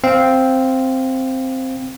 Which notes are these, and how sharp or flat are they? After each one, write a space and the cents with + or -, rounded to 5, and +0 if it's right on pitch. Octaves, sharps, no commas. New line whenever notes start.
C4 +0 F5 +0